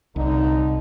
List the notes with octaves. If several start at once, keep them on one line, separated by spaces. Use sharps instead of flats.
C2 D3 D#4